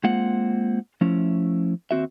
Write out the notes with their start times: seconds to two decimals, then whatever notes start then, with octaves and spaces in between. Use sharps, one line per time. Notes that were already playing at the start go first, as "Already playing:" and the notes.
0.04 G#3 A#3 C4 F4 F#5
1.01 F3 A3 C#4 E4
1.91 D#2 C4 F#4 E5